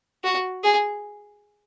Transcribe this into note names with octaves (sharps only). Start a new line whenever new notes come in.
F#4
G#4